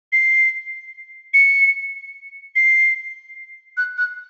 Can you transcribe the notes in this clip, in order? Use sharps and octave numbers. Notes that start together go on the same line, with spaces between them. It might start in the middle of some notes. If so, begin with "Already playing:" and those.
C7
C#7
C7
F#6
F#6